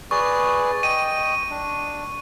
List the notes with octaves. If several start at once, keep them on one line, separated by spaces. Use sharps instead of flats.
G#4 B4 D5 C#6
D#5 G5 D#7
D4